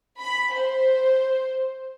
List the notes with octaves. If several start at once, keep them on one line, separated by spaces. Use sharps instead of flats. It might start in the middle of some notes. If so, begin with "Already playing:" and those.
B5
C5